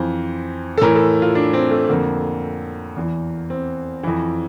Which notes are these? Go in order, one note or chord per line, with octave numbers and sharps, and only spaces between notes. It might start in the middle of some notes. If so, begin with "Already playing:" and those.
Already playing: F2 E3 C5
A4
A2 E3 A#4
A4
F4
D4
C4
A3
F2 D3 A#3
E2 E3
C4
F2 E3